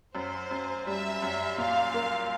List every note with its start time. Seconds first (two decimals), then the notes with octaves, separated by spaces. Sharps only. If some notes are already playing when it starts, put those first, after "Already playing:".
0.15 F#2 C5
0.51 F#2
0.87 G3 E5
1.22 F#2
1.58 A#2 F5
1.94 A#3